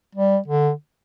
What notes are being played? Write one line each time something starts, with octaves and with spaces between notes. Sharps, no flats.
G3
D3